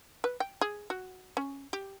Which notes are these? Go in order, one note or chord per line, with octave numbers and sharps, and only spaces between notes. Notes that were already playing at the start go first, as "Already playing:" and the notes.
B4
G5
G#4
F#4
C#4
G4